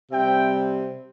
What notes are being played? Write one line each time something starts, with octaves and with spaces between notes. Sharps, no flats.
C3 G3 C4 E5 G5